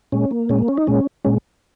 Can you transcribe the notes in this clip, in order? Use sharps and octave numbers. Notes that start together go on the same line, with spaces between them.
A#2 G#3 C#4
A#3
A#2 G#3 C#4
A#3
C#4
D#4
A#2 G#3 C#4
A#2 G#3 C#4